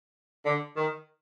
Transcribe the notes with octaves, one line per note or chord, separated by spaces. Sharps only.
D3
D#3